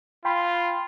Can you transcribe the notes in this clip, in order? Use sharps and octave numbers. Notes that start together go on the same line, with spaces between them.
F4 G5 B5 C6